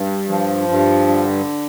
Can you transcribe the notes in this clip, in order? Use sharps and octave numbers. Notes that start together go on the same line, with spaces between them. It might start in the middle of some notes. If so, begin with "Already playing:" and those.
Already playing: G2
F3
G2
D3